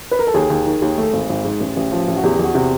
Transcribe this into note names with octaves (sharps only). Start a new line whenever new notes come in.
B4
A#4
A4
D#2 G#4
D#2
D#3
D#2
A3
G#1
G#1
G#2
A1
A1
F3
A1
F#4
E2 G4
E2
F#4
C3